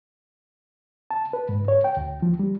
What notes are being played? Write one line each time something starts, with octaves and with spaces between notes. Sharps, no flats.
A5
B4
G#2
C#5
G5
D2
F3
G3